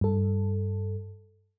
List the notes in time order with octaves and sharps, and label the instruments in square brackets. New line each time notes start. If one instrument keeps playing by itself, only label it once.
[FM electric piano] G2 A4